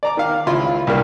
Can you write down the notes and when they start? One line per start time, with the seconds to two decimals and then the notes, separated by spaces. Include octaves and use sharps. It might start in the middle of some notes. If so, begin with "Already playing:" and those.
0.03 D5 A#5 D6
0.17 D#3 F5
0.47 C#2 E4 F4 C6
0.87 C2 G2 A#3